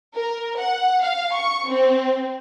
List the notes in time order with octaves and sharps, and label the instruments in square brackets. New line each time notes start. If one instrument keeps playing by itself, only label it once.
[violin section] A#4
F#5
F5
C#6
C4